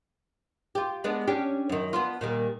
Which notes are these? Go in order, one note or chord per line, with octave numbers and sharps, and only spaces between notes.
F4 G4
G#3 B3 D4
C#4 D4 G4
F#2 D#3
B3 D4 F4
A#2 D#3 G3